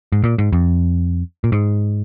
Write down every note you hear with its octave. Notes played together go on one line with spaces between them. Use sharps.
G#2
A#2
G#2
F2
A#2
G#2